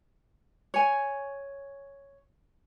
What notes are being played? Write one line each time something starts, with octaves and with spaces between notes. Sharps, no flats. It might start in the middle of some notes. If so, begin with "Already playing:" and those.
C#5 G#5